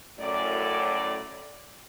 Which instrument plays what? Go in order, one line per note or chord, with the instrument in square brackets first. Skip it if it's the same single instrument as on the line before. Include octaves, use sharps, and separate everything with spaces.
[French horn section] F#2 A2 D5